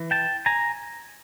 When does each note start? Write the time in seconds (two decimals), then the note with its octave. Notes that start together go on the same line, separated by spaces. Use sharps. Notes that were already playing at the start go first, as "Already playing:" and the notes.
Already playing: E3
0.11 G5 A5
0.46 G#5 A#5